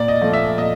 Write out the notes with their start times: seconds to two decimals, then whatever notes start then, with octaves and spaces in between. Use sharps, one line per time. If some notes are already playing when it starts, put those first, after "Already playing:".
Already playing: A#2 D5
0.08 D#5
0.21 F3 A3
0.33 E5
0.58 A#2 D#5